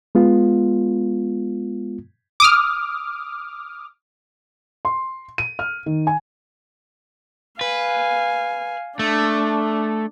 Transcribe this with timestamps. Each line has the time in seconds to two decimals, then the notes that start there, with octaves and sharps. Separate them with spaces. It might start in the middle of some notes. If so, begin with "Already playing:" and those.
0.15 G#3 B3 F4
2.40 D6 D#6 F6
4.85 C6
5.38 D#7
5.59 F6
5.86 D#3
6.07 G#5
7.61 B4 F5 G#5
8.99 A3 D4